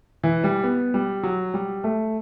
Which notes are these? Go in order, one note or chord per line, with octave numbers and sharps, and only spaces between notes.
E3
G3
B3
G3
F#3
G3
A3